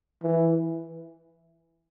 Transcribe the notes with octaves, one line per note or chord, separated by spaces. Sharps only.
E3